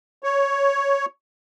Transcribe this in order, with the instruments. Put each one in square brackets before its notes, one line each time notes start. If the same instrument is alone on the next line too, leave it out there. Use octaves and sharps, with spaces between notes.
[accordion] C#5